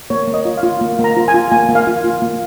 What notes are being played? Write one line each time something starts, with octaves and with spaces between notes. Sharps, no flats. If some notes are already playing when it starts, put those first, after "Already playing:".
A#3 C#5
A#3
D#5
F4
F5
F4
A#3
A#3
A#5
F4
G#5
F4
A#3 G#5
A#3
F5
F4
F4
A#3